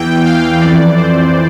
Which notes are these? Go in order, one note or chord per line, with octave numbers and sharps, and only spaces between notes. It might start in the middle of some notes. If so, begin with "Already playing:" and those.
Already playing: E2 E3 G5
F5
F2 E3 D5
C5